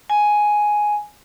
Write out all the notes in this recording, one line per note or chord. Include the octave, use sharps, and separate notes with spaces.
G#5